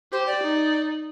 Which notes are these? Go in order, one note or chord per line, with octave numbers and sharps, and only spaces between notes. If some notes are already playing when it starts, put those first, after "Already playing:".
G4 C5
D5
D#4